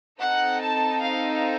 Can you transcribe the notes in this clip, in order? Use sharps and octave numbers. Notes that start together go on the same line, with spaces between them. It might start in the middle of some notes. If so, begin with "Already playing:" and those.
C4 D#4 A4 F#5
A5
F5